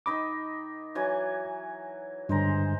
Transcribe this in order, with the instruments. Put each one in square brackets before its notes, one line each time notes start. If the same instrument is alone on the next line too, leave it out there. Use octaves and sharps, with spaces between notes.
[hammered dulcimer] D#3 D#5 B5 [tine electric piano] D6
[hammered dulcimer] E3 F#3 G#5
[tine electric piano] G2 D3 [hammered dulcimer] G#3 C5 A#5